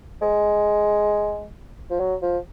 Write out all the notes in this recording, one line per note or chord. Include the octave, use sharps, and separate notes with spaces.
G#3
F3
F#3
F3